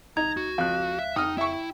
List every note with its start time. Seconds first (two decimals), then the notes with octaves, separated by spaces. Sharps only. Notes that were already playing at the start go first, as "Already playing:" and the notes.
0.17 B1 D#4 A#5 G#6
0.37 C#2 F#4
0.58 F2 F5 F#6
0.99 E5
1.16 F2 D#4 G5 D#6 F6
1.38 E4 E5 C#6